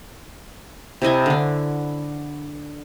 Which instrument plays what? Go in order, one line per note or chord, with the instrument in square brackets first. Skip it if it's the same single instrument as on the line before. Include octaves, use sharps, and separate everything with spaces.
[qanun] C3 E4 D#5 G#5
D3 D4